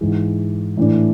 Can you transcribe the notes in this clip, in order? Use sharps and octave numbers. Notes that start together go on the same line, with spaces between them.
G#2 E3 G#3
A2 E3 A3 D4